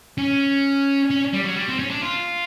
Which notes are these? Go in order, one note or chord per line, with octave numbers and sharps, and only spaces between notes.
C#4
C#4
G3
F#3
G3
C4
C#4
D4
F4